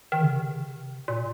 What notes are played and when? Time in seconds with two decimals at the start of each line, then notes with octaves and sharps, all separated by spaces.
0.12 D#3
0.22 C#3
0.32 C3
1.08 A#2